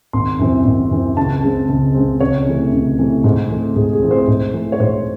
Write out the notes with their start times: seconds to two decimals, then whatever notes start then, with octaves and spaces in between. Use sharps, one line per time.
0.13 G#1 C6
0.39 F#2 E3 C4
0.65 G#1
0.91 F#2 E3 C4
1.17 C#2 A5
1.43 C#3 G#3 C4
1.69 C#2
1.94 C#3 G#3 C4
2.20 C#2 C#5
2.46 C3 E3 A3
2.72 C#2
2.99 C3 E3 A3
3.24 G#2
3.50 E3 A3 C4
3.76 G#2 G#4
3.93 G#4
4.01 E3 A3 C4
4.11 C5
4.27 G#2
4.53 E3 A3
4.72 C#5
4.80 G#2 C5